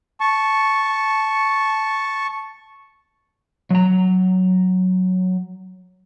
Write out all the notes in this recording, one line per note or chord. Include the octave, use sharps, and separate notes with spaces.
A5 C#6
F#3 A#5